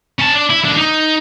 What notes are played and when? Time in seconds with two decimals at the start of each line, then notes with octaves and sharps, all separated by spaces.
0.19 C#4 A5
0.35 D4
0.50 E4
0.65 D#2 D4
0.77 D#4